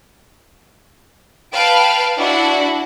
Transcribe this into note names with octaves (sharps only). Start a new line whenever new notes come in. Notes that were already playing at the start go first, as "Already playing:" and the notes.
B4 F5 G5 A5 D7
D4 E4 F#4 F#5